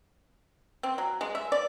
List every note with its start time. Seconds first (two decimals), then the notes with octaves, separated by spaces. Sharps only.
0.83 C4
0.98 F#3
1.21 G#3
1.35 E5
1.52 D5